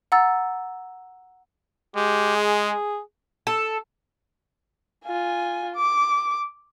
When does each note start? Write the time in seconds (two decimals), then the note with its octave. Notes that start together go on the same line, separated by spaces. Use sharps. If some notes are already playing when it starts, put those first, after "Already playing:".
0.12 F#5 A#5 E6 A6
1.96 G#3 G4
2.36 G#4
3.47 A4
5.05 F4 G#5
5.76 D6